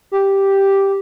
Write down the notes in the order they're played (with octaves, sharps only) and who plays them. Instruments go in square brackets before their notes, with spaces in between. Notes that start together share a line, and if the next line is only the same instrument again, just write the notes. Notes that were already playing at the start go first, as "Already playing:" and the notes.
[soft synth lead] G4